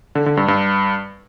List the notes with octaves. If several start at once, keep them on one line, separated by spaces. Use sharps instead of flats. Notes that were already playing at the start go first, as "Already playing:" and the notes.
D3
D3
G2
G2